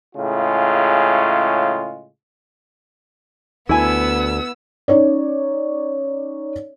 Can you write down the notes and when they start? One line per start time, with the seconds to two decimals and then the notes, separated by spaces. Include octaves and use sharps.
0.15 A2 C#3 G#3 F4
3.69 D2 B3 E4 G#5 E6
4.88 C#4 D#4 C#5 D5